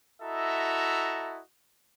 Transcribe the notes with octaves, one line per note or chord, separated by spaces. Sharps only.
E4 F#4 A4 D#5 E5 A#5